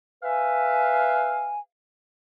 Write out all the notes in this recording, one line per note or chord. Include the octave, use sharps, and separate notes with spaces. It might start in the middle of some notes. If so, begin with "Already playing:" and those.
B4 E5 F5 G#5